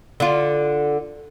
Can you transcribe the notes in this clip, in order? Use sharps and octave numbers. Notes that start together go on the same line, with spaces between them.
D3 F4